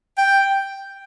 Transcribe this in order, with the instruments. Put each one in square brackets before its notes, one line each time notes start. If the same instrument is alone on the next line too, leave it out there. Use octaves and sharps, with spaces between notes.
[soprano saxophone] G5